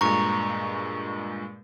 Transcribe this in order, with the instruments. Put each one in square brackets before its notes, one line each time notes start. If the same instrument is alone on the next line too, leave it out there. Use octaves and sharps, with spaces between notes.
[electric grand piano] G2 A#2 G#3 [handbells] A#5 C#6